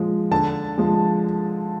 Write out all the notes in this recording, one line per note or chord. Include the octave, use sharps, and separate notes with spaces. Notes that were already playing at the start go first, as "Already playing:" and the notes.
Already playing: A#2 F3 G#3
D3 A5
F3 G#3